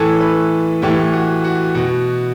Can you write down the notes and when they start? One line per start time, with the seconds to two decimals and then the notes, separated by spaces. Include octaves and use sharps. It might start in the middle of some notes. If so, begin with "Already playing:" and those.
Already playing: A2 E3 A4
0.20 B4
0.82 A2 E3 G4
1.13 F#4
1.44 F#4
1.75 B2 F#4